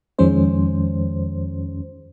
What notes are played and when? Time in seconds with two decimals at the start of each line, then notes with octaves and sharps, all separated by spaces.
0.19 F2 D#3 F3 G#3 C#4 C5